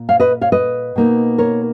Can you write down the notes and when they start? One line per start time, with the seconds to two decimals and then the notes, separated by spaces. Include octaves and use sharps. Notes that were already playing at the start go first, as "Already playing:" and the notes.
Already playing: A#2
0.09 C#5 F5
0.20 B4 D#5
0.41 C#5 F5
0.52 B4 D#5
0.96 B2 A#3 D#4
1.38 A#4 C#5